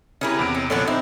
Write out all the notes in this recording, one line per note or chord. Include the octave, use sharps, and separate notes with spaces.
C#3 C#4 E4 G4 A#4 B4
E2 C3 D7
C#4
A#1 A#2 D3 B3 D4 C#5
C4 D#4 E4 C5